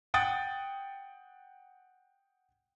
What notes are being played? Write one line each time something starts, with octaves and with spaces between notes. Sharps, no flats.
F#5 G5 D#6 A6